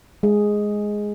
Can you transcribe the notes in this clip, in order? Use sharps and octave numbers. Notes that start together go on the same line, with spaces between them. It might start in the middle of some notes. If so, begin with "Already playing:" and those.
G#3 G#4